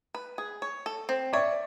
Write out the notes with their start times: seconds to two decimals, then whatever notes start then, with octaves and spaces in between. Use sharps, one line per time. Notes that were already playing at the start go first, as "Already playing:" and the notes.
0.15 B4
0.38 G#4
0.62 C#5
0.86 A4
1.09 C4
1.33 C#5 D5 E5